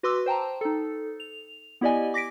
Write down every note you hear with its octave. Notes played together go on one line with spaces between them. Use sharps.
F#4 B4 C6 D6 E6
C5 G5 A5 A#5
D#4 A4
F7
B3 E4 G4 D5 D#5 G#5
D6 A#6 B6 D7